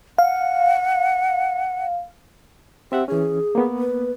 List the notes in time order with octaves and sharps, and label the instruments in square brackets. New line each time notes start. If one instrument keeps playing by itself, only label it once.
[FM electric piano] F5 [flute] F#5
[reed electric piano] C4 E5 F#5 [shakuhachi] G4
[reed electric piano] E3 C#4 [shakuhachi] G#4
[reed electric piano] A#3 B3
[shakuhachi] B4